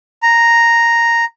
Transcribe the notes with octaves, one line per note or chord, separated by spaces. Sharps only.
A#5